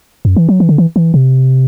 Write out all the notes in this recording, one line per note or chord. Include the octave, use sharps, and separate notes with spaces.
F#2
E3
F#3
E3
D3
E3
E3
C3